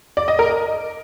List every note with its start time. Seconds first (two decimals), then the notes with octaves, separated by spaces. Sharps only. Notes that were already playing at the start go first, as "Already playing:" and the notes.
0.17 D5
0.28 D#5
0.39 A#4
0.50 D#5